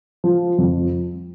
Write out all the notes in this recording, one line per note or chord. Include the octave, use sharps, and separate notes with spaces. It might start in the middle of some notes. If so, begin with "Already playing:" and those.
F3
F2